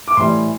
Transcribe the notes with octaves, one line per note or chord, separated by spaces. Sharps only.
D6
A2 E3 G3 C6